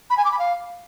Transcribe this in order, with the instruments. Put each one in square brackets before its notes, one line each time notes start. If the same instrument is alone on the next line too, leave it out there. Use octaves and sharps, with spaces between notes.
[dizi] B5
G#5
D6
B5
F5